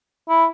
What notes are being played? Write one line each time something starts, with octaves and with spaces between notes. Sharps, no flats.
E4